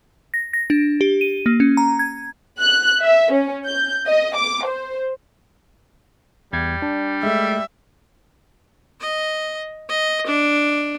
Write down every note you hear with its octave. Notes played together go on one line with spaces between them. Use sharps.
A#6
A#6
D4
G4
D#7
A#3
C#4
A#5
G#6
F#6
E5
C#4
G6
D#5
D6
C5
E2 G3 G#6
D4
G#3 A3 E5
D#5
D#5
D4